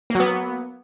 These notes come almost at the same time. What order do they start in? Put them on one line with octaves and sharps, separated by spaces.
A#3 F#3 B3